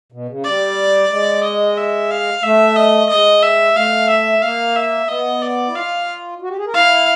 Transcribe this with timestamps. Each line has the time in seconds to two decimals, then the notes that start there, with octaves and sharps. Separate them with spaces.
0.12 B2
0.28 C#3
0.44 G3 D5
1.11 G#3
1.44 D#5
1.78 E5
2.11 F5
2.43 A3 E5
2.76 D#5
3.10 G#3 D#5
3.42 E5
3.75 A3 F5
4.09 E5
4.42 A#3 F5
4.76 E5
5.08 B3 D#5
5.42 D5
5.67 E4
5.75 F4 F5
6.42 F#4
6.50 G4
6.58 G#4
6.66 A#4
6.74 E4 F5